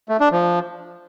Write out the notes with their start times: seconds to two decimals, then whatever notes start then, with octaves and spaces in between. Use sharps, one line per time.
0.09 A3
0.20 D4
0.32 F3